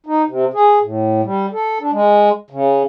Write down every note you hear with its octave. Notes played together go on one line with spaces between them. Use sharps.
D#4
C3
G#4
A2
G3
A4
D4
G#3
C#3